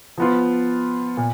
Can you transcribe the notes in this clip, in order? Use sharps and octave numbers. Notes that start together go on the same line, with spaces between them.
F3 B3 F4
A#2